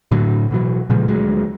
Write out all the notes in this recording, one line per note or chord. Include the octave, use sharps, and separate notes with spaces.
A2 D3 F#3
B2 E3 F#3
A#2 C#3 F3 G#3
D2 F#3 G#3